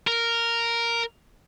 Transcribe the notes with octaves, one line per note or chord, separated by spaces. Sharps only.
A#4